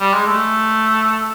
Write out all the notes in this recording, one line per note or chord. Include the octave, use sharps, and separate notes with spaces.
G3
G#3
A3